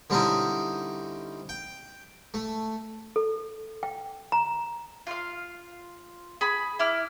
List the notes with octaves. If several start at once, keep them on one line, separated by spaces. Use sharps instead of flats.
D3 G3 C4 C#4 D#4 E4
G5
A3
A4
G5
A#5
F4 F5
G#4 B5
E4 D6 F6